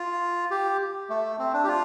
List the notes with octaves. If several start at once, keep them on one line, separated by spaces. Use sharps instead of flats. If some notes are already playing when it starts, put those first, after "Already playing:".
Already playing: F4
G4
A3
C4
D4
G4
F4